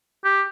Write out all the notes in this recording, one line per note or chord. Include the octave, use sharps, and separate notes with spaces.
G4